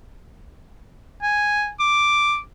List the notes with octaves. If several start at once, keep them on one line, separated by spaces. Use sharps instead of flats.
G#5
D6